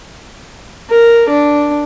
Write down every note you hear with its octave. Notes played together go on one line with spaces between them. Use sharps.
A#4
D4